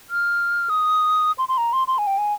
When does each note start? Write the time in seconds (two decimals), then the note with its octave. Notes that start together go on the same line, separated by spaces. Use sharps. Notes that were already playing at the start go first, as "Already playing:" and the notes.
0.10 F6
0.69 D#6
1.38 C6
1.49 C6
1.58 A#5
1.73 C6
1.88 C6
1.98 G#5
2.07 G5
2.18 G#5